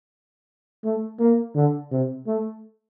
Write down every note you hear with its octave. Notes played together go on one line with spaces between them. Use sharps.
A3
A#3
D3
C3
A3